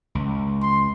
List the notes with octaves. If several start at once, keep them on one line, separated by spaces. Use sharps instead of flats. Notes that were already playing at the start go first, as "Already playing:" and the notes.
C#2
C6